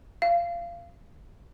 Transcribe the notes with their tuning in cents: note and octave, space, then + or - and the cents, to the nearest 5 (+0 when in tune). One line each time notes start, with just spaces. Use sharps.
F5 -20